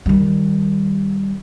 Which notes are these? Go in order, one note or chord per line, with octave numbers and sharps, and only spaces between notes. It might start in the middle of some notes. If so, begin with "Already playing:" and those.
D#3 G3